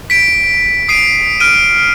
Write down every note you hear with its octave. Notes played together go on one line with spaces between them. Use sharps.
B6 D7
D#6 C7 D7 D#7
F6 D7 D#7